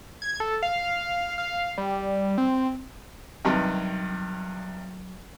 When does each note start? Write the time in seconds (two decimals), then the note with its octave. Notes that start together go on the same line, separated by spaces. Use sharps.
0.22 G#6
0.40 A4
0.62 F5
1.38 F5
1.78 G3
2.38 C4
3.45 G2 C3 D#3 F#3